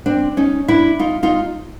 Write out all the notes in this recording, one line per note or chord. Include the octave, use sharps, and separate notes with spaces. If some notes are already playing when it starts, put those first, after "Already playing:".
C4 D4
C#4 D#4
D4 E4
D#4 F4
D#4 F4